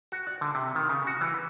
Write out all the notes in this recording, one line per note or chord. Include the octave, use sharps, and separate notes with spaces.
F#4
D5
D3
C3
D#3
C#3
F#4
E3
B4